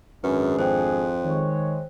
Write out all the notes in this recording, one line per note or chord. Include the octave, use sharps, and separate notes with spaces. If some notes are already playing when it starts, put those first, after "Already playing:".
G#1 F#2 D4 G#4 B4
F2 C5 G5
D#3 G#3 C#5